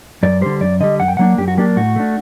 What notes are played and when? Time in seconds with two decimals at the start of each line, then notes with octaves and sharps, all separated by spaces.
0.23 F#2 D5
0.42 D3 G3 C5
0.61 F#2 D5
0.80 D3 G3 D#5
1.00 F#2 F#5
1.08 G5
1.17 F#3 A#3 D4 F#5
1.38 F#2 G4
1.48 F#4
1.57 F#3 A#3 D4 G4
1.76 A2 F#4
1.96 A3 D4